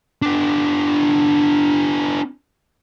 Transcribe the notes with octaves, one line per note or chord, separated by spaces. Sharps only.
B3 D4